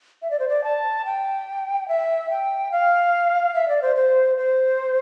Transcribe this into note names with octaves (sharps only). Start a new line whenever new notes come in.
E5
D5
C5
D5
A5
G5
E5
G5
F5
E5
D5
C5
C5
C5